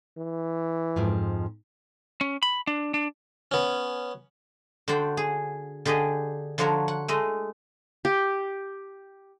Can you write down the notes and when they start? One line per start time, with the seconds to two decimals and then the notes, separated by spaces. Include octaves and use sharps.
0.17 E3
0.96 F2 G#2 F3
2.21 C#4
2.43 B5
2.67 D4
2.94 D4
3.51 B3 C#4
4.88 D3 F#4 C5 D5 G5
5.17 G#4
5.85 D3 G4 G#4 D5 D#5
6.58 D3 F3 D4 F#4 C#5 A#5
6.88 F#5
7.08 G#3 A3 D#5
8.05 G4